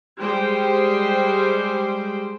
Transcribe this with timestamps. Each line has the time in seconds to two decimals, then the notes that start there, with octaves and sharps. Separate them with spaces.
0.20 G3 G#3 C5 G5